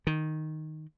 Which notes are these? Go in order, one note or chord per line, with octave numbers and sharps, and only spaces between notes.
D#3